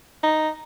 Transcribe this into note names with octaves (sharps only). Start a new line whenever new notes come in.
D#4